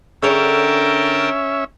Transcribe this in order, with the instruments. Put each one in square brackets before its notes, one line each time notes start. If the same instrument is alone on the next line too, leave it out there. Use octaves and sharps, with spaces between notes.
[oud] D3 G#4 C#5 [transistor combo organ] C#4 E5 [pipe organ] A#4 G5 A5